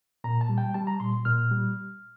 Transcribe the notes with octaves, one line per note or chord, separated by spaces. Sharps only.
A#2 A#5
A5
G3
G5
G3 A5
A#5
A#2 C6
A#2 F6
G3